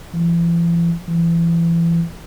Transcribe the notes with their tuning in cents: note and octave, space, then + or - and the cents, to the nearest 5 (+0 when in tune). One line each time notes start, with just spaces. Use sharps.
E3 +45
E3 +30